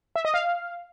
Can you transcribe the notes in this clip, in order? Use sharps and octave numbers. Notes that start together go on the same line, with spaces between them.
E5
D#5
F5